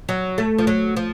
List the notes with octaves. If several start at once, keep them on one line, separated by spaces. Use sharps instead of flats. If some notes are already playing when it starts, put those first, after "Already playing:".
F#3
A3
F3
F#3
F3